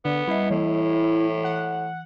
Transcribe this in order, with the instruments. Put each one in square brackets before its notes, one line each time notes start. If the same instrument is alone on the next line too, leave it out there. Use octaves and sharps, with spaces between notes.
[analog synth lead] D3 [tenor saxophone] B3
[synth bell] G3 D#5 [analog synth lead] E4
[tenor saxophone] A2 [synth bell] E3
[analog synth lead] F#5